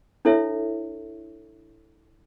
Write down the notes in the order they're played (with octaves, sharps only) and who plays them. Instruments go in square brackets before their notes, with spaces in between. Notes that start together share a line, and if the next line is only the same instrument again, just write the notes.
[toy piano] D4 E4 A4 C#5 E5